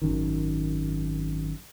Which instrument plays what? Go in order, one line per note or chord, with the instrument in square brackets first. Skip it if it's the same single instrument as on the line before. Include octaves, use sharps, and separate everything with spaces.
[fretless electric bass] G#1 F#2 D#3